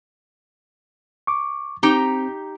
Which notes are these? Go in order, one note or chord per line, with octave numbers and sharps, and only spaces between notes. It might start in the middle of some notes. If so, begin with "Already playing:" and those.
C#6 D6
C4 D#4 G4 A#5